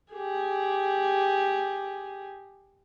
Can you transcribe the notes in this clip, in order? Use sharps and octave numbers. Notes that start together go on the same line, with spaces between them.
G4 G#4